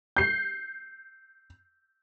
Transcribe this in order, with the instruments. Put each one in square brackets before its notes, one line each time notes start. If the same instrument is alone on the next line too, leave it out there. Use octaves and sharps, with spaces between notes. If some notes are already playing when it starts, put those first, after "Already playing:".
[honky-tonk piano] G6 C7